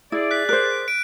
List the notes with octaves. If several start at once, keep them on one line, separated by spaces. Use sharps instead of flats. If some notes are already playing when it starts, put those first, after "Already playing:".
E4 G#4 D5
F#6 B6
A#4 C5 F#6
D7